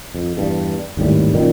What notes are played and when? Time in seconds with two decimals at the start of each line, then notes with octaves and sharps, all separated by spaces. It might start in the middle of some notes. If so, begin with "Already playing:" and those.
0.14 F2
0.37 E2 G2
0.97 G#1 D#2 A2 G3
1.34 F#2 A#2 D#3